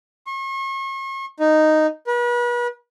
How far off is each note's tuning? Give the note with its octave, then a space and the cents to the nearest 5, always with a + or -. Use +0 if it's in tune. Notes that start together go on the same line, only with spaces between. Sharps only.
C#6 -40
D#4 -5
B4 -40